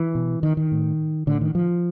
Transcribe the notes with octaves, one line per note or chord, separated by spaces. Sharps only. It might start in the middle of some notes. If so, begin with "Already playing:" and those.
Already playing: E3
B2
D#3
D#3
A2
A2 D3
D#3
F3